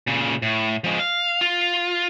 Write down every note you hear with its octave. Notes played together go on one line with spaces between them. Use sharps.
A#2 C#3
A2
F3 G#3
F5
F4